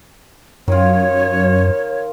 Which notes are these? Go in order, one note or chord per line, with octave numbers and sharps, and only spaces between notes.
F#2 D#3 F4 C#5